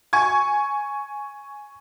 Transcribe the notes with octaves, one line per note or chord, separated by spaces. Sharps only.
G#5 C#6 G#6